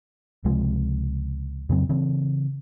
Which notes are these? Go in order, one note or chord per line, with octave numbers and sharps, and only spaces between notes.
C#2 C3 F3 G#3
F2 C#3 F#3 C4
C#3 E3 C4